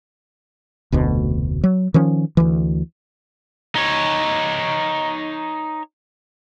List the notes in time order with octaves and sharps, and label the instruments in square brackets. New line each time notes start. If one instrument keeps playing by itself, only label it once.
[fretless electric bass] F1 D2 B2
F#3
D#3 F3 C#4
D2 E3
[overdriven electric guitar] D#4 C#5